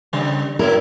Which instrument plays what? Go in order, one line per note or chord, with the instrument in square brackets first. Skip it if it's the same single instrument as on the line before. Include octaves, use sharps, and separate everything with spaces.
[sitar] C#3 G3
[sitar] G2 F#3 E4 [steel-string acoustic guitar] A#4